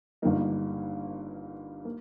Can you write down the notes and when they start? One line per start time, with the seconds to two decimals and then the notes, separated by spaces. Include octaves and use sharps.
0.22 G1 G2 G3 A#3 D#4
1.85 A#3